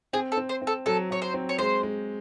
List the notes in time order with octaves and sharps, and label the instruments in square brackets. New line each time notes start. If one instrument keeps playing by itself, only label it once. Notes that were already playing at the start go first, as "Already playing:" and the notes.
[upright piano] C4 [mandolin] G#4
[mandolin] A4
[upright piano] C4
[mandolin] C5
[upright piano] C4
[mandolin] A4
[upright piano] F#3 [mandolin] A4
[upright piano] F#3 [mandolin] C#5
[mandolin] C5
[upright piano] C4
[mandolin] C#5
[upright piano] G#3 [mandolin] C5
[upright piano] G#3